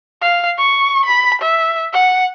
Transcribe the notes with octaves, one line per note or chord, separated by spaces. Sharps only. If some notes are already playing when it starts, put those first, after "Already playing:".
F5
C#6
B5
E5
F#5